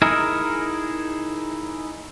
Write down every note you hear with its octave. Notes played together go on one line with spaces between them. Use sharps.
D#4 E4 G#4 A#4